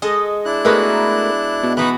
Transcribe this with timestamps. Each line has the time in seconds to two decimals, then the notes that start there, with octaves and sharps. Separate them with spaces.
0.02 G#3 A4 D#5
0.45 D4 E4 F#6
0.65 G#3 A3 B3 F#4 A#4 B4
1.63 B2
1.77 E3 B3 D#4 F#4 B4 F#6